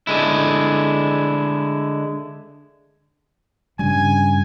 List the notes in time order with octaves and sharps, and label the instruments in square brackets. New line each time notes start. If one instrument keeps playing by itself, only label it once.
[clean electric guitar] D3 G#3 E4
[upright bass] G2 [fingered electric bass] C#3 G3 [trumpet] G#5